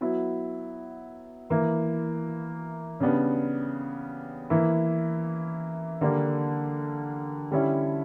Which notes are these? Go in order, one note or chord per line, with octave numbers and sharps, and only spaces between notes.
F#3 B3 E4
E3 A#3 E4
C#3 G3 B3 D4
E3 A#3 E4
D3 G3 A#3 D4
D3 G3 C#4 E4